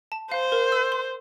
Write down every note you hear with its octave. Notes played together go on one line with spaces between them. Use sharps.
A5
C5 F5
A#4
E6
C6